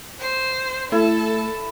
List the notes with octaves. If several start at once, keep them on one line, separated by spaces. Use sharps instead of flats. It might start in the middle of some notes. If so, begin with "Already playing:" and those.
C5
A3 E4 A4